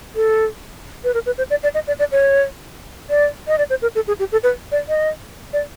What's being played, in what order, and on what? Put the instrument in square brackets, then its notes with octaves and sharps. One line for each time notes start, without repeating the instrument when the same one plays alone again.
[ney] A4
B4
A#4
B4
C5
D5
D5
D#5
D5
D5
C#5
D5
D#5
D5
C5
A#4
A4
G#4
G4
A4
B4
D5
D#5
D5